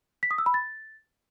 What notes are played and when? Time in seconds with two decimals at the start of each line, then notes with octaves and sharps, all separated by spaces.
0.23 B6
0.31 D#6
0.38 E6
0.46 B5
0.54 A6